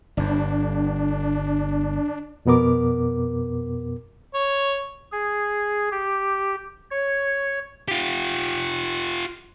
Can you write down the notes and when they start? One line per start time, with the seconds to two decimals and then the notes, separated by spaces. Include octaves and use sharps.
0.17 G1 G2 D4
2.46 F2 B2 B3 A#4 D6
4.34 C#5
5.12 G#4
5.92 G4
6.91 C#5
7.88 F4 G4